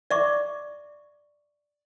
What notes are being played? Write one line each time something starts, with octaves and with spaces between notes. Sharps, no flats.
D5 E5 C#6 D6